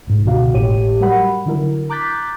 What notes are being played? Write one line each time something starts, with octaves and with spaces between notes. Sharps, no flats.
C2 G#2
C#2 B2 D3 F#4 F5
G#1 A2 G4 C#5 D#7
F#3 G3 A#4 F#5 B5
D3 F#3 E4 A#4
A#5 D6 F#6 G6 A6 B6